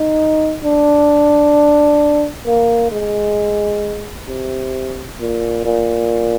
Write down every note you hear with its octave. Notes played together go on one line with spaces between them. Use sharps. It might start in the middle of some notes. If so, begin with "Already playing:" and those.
Already playing: D#4
D4
A#3
G#3
C3
A#2
A#2